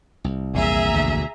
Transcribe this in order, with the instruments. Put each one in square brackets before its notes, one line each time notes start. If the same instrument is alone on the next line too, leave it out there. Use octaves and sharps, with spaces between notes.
[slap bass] C2
[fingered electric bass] A#1 E2 A#2 [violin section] G#4 E5 A#5
[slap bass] D2 B2 D3